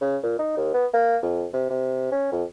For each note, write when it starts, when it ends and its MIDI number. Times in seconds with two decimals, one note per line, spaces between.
0.01 0.17 49
0.23 0.36 46
0.39 0.54 63
0.57 0.69 39
0.74 0.86 59
0.93 1.17 58
1.22 1.45 41
1.53 1.67 48
1.70 2.10 48
2.12 2.29 61
2.32 2.44 41